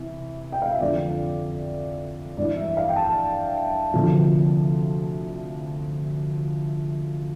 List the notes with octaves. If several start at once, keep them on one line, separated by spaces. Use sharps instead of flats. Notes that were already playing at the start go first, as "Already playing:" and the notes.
Already playing: C3 E3
G5
F5
E5
F2 D3 F3 D5
G2 E3 D5
E5
F5
G5
A5
D2 C3 F3